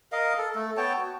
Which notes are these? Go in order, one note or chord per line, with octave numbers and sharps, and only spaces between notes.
A#4 D#5 F5
A4
A3 A4
B3 C#5 G5 A5
F#4